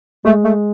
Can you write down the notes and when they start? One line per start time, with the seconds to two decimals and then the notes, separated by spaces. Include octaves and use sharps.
0.25 G#3 A3
0.45 A3